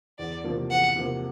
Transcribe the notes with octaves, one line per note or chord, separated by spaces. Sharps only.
E2 D5
C3 F3 A#3
E2 F#5
C3 F3 A#3